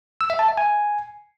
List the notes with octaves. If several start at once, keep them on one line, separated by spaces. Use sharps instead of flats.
E6
E5
A5
E5
G#5